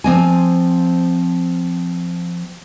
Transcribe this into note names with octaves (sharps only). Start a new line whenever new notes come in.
F3 C4 G#5